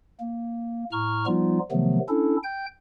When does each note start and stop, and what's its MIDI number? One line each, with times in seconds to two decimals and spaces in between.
0.20 0.85 58
0.92 1.26 45
0.92 1.26 82
0.92 1.26 85
0.92 1.26 89
1.26 1.59 53
1.26 1.59 55
1.26 1.59 59
1.26 1.59 63
1.26 1.59 65
1.71 1.99 48
1.71 1.99 51
1.71 1.99 53
1.71 1.99 54
1.71 1.99 57
1.71 1.99 59
2.09 2.37 61
2.09 2.37 62
2.09 2.37 64
2.09 2.37 69
2.44 2.66 79
2.44 2.66 91